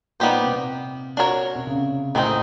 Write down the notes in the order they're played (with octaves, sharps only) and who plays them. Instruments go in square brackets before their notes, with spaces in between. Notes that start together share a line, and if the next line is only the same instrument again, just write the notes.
[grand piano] A#2 [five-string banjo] G3 B3 D#4 G4 C5
[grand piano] C3
[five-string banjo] D4 F#4 A#4 C#5
[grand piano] C3
C#3
[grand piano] A2 [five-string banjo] D#3 G#3 C4 D#4